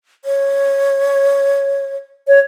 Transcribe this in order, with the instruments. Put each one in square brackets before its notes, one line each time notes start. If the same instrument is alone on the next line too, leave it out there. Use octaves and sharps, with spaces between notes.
[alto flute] C#5
[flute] C#5